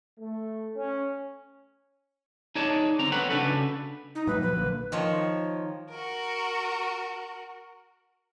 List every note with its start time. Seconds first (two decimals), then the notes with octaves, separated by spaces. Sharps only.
0.18 A3
0.75 C#4
2.55 D#4 G#4 C#5 D5 A5
2.99 D3 C4 A#5
3.12 C4 A4 B4 C#5 F#5
3.30 C#3 A#3 D4 F#4 A4 B4
4.15 D#4
4.27 A#2 F#3 A3 B4
4.42 A#2 F3 F#3 B4
4.55 A#1 D3 A#3
4.92 D#3 F3 C#5
5.90 F#4 A#4